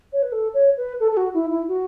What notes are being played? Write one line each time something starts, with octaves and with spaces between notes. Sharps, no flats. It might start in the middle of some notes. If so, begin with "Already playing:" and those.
C#5
B4
A4
C#5
B4
A4
A4
F#4
E4
E4
F#4